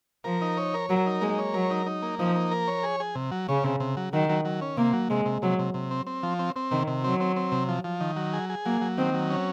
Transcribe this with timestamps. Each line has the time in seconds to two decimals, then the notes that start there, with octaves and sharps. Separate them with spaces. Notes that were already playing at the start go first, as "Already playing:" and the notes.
0.24 F3 A#4
0.41 D#4
0.57 C#5
0.74 A#4
0.89 F#3 A#4
1.06 D#4
1.21 G#3 A#3
1.38 C#5
1.54 F#3 A#4
1.70 D#4
1.86 D#4
2.02 A#3
2.19 F3 D#4
2.36 A#3
2.51 A#4
2.68 C#5
2.83 G#4
3.00 G#4
3.15 C3
3.31 F#3
3.48 C#3 C#4
3.64 C3
3.80 C3
3.97 F#3
4.13 D#3 F#3
4.29 F#3
4.45 F#3
4.61 C#4
4.77 C3 A#3
4.93 F#3
5.10 C3 G#3
5.25 C3
5.42 C3 F#3
5.59 C3
5.74 C3
5.91 C4
6.07 C4
6.23 F3
6.39 C4
6.56 C4
6.71 C3 D#3
6.87 C3
7.04 F#3 C4
7.20 C4
7.36 C4
7.52 C3
7.69 F3
7.84 F3
8.00 D#3
8.16 F#3
8.33 G#4
8.49 G#4
8.66 F#3 A#3
8.81 F#3
8.98 D#3 C4
9.14 F#3
9.30 C#4